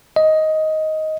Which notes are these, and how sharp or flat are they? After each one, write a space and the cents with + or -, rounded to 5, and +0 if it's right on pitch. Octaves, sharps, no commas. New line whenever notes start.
D#5 +10